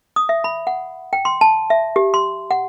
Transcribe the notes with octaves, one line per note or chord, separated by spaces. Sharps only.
D#6
E5
B5
F#5
G5
C6
A5
E5
G4
C6
F#5